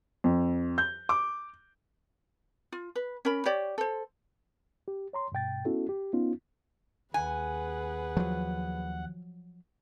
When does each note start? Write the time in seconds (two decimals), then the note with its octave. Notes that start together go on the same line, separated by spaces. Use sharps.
0.24 F2
0.78 G6
1.09 D6
2.72 F4
2.96 B4
3.25 C#4 A#4 B5
3.45 G4 C#5 D5
3.78 A4 C5
4.88 G4
5.13 C#5 A#5 C6
5.32 G2 B2 G5 A6
5.65 B3 C#4 E4 F#4 A4
5.89 G4
6.13 B3 C#4 D#4 F4
7.14 D#2 G#4 B4 F#5 G#5
8.17 F3 F#3